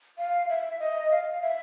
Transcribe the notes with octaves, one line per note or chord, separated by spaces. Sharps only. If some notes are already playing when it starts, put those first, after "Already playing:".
F5
E5
D#5
F5
E5